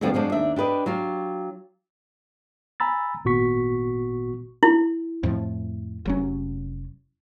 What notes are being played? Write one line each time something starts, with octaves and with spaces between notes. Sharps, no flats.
F2 B2 D3 F3 G3 B3
F#2 F3 G#3 D4
D#2 D4 E5
D4 G4 B4 D#5
F#3 F4 G4
G#5 A#5 B5 E6 A6
G#1 A#2 B3 F#4 C#6 B6
E4
F2 A2 F3
F1 F#3 C#4